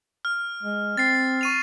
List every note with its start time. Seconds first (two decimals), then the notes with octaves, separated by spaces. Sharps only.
0.25 F6
0.63 G#3
0.97 C4 A6 C7
1.41 C#6 D#7 F7